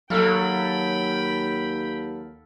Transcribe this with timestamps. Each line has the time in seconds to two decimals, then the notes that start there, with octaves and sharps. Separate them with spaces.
0.10 D#2 F#3 A4 F5 G5 B5